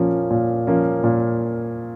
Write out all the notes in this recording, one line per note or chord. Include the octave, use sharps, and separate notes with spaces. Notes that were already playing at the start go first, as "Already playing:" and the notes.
Already playing: A#2 F3 A#3 C#4 F4
A#2
F3 A#3 C#4 F4
A#2